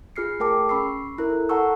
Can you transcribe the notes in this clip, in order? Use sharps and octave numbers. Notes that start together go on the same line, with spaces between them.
F4 G#4 F6 C7 C#7
A3 G#4 A#4 G5 A5 D6
C#4 B5 C#6 E6 C7
E4 A#4
A4
A4 F#5 A5 A#5 C#6 E6